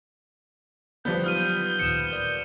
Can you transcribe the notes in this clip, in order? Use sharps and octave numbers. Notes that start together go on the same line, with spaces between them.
F3 G3 B3 G6
F#3 D#4 F4 D#6 F6 D#7
D2 A#2 D#3 C#7 E7
A#4 D5